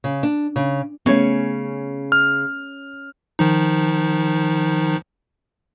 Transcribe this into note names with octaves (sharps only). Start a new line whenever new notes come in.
C#3
D4
C#3
C#3 A3 B3 C#4 C#5
F6
D#3 F3 D#4